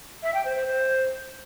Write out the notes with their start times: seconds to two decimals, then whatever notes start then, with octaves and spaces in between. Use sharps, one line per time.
0.23 E5
0.34 G5
0.45 C5
0.56 C5
0.67 C5